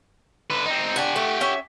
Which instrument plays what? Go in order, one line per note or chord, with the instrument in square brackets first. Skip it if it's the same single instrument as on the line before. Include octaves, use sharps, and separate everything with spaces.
[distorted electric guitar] D3 B4
C4 D#4
[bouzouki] D4 G#5 [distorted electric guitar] G4 F#5
[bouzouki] A3
C#4 E5